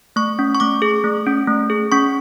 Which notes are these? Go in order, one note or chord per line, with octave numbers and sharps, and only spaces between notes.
A3 C#6
C#4
C#6
A3 D6
G#4
A3
C#4
A3
G#4
C#4 C#6